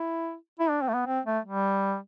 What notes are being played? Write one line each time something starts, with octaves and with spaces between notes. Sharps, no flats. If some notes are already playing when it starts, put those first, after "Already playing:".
Already playing: E4
E4
D4
C4
A3
B3
C4
A3
G3